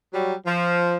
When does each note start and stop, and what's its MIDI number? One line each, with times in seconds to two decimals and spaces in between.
0.13 0.34 54
0.13 0.34 55
0.45 0.96 53